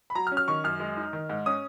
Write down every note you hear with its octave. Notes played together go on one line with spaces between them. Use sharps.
B5
F#3 A#5
F6
C#4
F6
D#3 C#6
F#2 F6
G#3
D#4
D#3
G#2
C#4 D#6